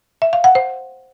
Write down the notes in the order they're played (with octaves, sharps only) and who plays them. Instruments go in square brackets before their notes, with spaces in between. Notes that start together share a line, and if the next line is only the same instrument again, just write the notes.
[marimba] E5
F5
F#5
C5